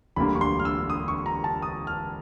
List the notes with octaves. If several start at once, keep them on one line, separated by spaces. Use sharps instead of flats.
E1 D2 D3 G3 A#3 B5
C#6
C6
F6
E6
D#6
C#6
A#5
A5
D#6
F6